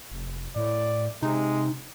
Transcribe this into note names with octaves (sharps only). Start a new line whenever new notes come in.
F1
A2 D5
C3 G#3 D#4